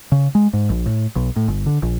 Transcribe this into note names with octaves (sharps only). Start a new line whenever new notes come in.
C#3
G#3
G#2
A#1
A2
B1
A2
G1
D3
A#1